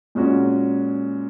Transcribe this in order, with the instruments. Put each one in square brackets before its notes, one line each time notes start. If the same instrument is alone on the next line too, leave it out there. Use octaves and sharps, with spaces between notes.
[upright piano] A#2 G#3 C#4 F#4